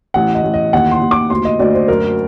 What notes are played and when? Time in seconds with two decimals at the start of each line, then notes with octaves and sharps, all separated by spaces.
0.14 A1 F#5
0.35 D#5
0.43 A1
0.54 D#5
0.73 D#2 F#5
0.91 C6
1.01 D#2
1.11 D6
1.30 D2 C6
1.45 D#5
1.59 D2 D5
1.74 C5
1.88 F#2 A#4